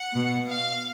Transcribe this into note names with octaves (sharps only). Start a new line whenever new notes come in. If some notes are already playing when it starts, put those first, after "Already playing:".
Already playing: F#5
B2
F5